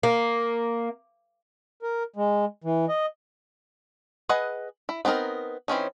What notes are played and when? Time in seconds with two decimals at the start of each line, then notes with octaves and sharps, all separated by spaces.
0.03 A#3
1.82 A#4
2.16 G#3
2.64 E3
2.89 D#5
4.29 G#4 B4 D#5 F#5
4.89 E4
5.05 B3 C4 D4 D#4 A#4
5.68 E3 C4 C#4 D#4